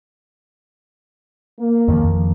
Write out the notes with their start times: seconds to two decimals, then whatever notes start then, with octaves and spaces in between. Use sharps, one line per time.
1.59 A#3
1.88 F2 D#3 F3